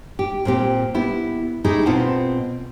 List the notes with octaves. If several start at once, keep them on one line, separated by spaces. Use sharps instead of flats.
G4
A#2 C4 G4
B3 E4 G4
A3 D#4 E4 G4 G#4
B2 C4 F4 F#5 A5